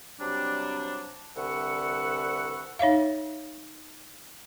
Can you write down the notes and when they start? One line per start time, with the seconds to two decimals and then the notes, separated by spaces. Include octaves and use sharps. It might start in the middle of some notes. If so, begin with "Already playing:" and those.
0.20 C3 F#3 G3 D4
1.37 C2 D3 B4 E5 F#5 C#6
2.79 D#4 C#5 E5 F5